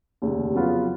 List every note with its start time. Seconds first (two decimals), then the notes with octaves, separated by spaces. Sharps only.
0.22 F1 D#2 C#3
0.54 F2 C#3 F#3 B3 F4